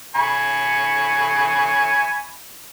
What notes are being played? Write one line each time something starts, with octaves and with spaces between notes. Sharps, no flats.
G#5 B5 C#6